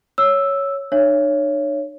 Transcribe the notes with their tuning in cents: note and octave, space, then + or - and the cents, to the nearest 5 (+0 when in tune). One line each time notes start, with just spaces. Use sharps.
C#5 +0 E6 +0
D4 +45 C#5 +5 E5 +35